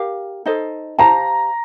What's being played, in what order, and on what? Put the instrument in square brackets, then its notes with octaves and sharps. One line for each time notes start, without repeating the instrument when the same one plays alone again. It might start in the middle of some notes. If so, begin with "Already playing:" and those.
Already playing: [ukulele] G4 A#4 F5
D#4 A4 C5 D#5
[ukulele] G4 C5 F5 A5 [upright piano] A#5